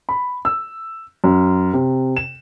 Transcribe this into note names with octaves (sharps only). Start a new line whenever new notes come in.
B5
E6
F#2
C3
E7